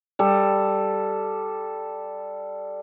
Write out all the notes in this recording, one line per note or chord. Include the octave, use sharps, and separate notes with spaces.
G3 A4